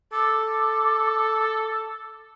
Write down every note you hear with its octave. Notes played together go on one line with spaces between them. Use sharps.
A4 D6